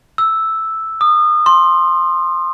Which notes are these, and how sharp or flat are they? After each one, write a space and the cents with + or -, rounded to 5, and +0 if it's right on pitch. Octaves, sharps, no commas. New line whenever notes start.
E6 -5
D#6 -30
C6 +15